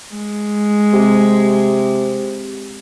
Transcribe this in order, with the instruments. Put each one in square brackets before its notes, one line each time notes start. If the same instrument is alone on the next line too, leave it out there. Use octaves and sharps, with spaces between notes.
[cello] G#3
[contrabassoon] C3